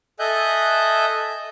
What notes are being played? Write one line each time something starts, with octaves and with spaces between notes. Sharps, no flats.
A4 D#5 E5 G#5 F#6 G6